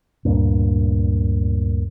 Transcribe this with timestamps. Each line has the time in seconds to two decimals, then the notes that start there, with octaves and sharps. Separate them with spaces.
0.25 D2 G2 A#2